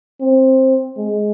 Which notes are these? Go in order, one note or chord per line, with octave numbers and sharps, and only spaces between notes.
C4
G#3